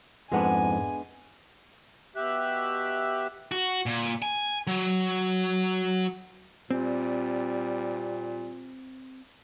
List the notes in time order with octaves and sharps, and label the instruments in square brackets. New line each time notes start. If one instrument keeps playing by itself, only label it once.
[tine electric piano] F2 G#2 [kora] G#3 B3 D4 [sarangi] G#5
[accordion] B2 G4 E5 F#6
[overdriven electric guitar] F#4
A#2
G#5
F#3
[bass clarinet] A#2 [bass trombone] G3 [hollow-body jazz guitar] C4